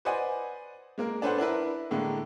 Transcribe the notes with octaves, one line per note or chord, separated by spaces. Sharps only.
B4 C5 D5 D#5 F#5 G#5
G#3 A#3 A#4
C#4 D4 A4 B4 C5 F#5
D4 E4 A#4 B4
A2 D3 G#3 A#3